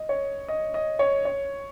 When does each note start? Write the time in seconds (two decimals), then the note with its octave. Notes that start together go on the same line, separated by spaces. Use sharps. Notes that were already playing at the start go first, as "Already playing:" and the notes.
Already playing: D#5
0.09 C#5
0.48 D#5
0.74 D#5
0.99 C#5
1.25 C#5